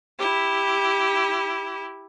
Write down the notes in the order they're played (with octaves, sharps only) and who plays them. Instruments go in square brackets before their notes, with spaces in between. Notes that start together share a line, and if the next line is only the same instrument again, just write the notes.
[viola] E4 G4